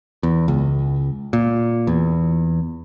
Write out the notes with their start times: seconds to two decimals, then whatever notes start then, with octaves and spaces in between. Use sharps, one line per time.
0.23 E2
0.48 C#2
1.33 A#2
1.87 E2